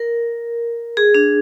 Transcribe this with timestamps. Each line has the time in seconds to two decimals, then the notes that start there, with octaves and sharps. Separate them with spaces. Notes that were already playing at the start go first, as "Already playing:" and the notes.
Already playing: A#4
0.97 G#4
1.14 D4